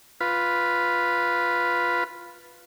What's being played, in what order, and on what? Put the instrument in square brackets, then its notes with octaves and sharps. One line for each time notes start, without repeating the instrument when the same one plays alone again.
[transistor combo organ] F4 B4